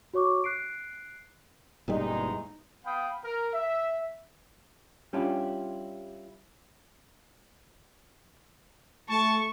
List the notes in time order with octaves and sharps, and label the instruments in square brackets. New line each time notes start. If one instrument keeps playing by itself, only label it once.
[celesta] F#4 C#5 C#6 D6
F#6 C7 D7
[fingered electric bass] F#1 A#2 G3 [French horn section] E2 G#3 D#4
[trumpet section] B3 F5 G5 B5 D#6
A#4
E5
[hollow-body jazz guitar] G3 C#4 D4 E4 F4 G4
[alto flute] A3 [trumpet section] A5 [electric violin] C#6